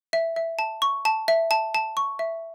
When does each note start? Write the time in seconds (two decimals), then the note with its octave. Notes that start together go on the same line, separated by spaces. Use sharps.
0.13 E5
0.36 E5
0.59 A5
0.82 C#6
1.05 A5
1.28 E5
1.51 A5
1.75 A5
1.97 C#6
2.19 E5